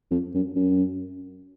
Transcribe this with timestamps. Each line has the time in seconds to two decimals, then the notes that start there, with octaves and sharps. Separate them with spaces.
0.11 F2
0.34 F#2
0.56 F#2